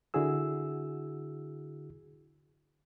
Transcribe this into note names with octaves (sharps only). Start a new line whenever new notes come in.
D3 E4 F#4 G#4 E6